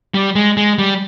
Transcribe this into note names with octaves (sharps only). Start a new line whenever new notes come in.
G3
G#3
G#3
G3